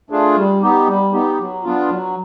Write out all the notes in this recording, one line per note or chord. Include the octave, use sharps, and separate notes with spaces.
A3 D4 F4 G#4
G3
B3 D#4 G4
G3
B3 D#4 G4
F#3
B3 D4 F4
F#3